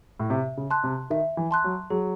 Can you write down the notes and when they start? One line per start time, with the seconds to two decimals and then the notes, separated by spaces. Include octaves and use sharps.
0.20 A2
0.30 C3 E5
0.57 C#3
0.70 A5 C6 F#6
0.84 C3
1.10 D#3 E5
1.37 E3
1.51 A5 C6 F#6
1.64 F#3
1.90 F#3 G#4